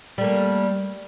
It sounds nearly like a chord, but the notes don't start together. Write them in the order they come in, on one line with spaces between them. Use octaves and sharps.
G3 A3 A#3